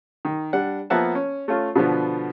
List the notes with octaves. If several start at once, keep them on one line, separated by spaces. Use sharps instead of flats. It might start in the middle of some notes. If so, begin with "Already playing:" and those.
D#3
G3 D4 F#5
F3 A#3 B3 E5 F#5 A5
C#4
A3 C#4 F4
B2 D3 F3 B3